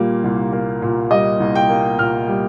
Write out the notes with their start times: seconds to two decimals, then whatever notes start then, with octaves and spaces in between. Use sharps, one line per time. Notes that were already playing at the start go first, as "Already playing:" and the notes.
Already playing: A#2 G3 A#3
0.24 C2
0.53 A#3
0.82 A#2
1.11 G3 D#5
1.40 C2
1.55 G5
1.69 A#3
1.98 A#2 F6
2.28 G3